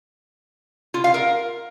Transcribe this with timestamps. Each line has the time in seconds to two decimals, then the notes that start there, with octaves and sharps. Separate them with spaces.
0.94 F4
1.04 F5
1.14 A#4